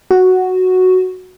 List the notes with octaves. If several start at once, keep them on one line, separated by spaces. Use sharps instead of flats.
F#4